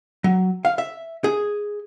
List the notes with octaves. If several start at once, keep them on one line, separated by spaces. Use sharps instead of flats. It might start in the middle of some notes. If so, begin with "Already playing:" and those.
F#3
F5
E5
G#4